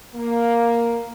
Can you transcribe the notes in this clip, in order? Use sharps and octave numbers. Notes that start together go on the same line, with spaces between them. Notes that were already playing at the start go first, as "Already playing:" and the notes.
A#3